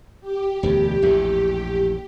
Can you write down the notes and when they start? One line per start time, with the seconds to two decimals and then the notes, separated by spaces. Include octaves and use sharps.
0.21 G4
0.63 E1 D2 G2
1.02 A#1 E2 A2